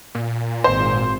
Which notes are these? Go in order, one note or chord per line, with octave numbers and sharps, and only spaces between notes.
A#2
G#1 C5